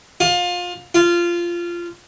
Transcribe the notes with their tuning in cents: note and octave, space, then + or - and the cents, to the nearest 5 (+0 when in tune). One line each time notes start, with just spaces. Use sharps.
F4 +25
F4 -15